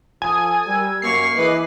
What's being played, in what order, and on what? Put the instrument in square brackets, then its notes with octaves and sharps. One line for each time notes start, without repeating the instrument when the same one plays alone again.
[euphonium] F3 [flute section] A4 D#6 [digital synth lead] G#5
[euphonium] G3 [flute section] A#4 E6 G#6
[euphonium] F#2 [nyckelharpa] A#3 C#6 [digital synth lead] C7
[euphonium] E3 [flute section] G#4 D#5 D6 [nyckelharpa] B4